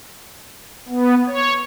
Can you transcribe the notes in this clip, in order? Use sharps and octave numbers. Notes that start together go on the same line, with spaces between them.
B3
C#5